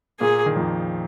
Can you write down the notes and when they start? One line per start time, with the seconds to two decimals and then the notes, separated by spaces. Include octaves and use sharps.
0.20 A#2 A#3 G#4
0.46 D#3
0.56 F2 F3